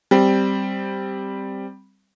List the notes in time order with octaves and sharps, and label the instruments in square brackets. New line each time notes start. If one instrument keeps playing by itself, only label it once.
[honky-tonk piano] G3 C4